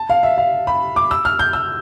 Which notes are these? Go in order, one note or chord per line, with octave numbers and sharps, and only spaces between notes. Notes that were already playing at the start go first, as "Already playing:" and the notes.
Already playing: A5
F5
E5
F5
B5
D6
E6
F6
G6
E6